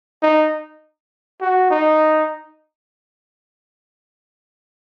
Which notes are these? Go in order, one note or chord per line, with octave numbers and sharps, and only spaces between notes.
D#4
F#4
D#4